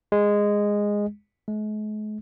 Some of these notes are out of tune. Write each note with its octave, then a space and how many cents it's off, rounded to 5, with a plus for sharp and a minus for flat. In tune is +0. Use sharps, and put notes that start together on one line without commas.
G#3 -10
G#3 +45